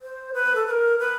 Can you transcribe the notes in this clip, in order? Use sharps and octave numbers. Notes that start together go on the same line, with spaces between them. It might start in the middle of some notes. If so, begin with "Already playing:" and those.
C5
B4
A4
B4
A#4
B4